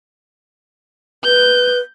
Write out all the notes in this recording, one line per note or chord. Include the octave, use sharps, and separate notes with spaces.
B4 G6